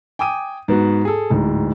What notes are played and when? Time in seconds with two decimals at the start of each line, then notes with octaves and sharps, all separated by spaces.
0.19 G5 G#5 D6 D#6 D#7
0.68 G#2 B3 F#4
1.05 G#4 A4
1.30 D1 G#2